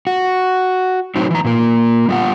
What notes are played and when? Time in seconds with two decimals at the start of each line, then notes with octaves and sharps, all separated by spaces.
0.07 F#4
1.16 A2 F#3 C4 D#4
1.31 E3 A#5
1.45 A#2 A#3
2.09 G3 B3 F4 F#5